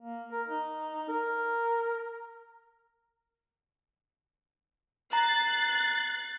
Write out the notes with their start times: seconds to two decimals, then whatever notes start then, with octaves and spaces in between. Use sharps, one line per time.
0.01 A#3
0.31 A#4
0.48 D#4
1.08 A#4
5.13 A#5 F#6 A6 C7